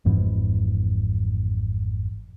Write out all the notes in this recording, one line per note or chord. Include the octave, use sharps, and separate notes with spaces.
G#1 F2 G#2 E3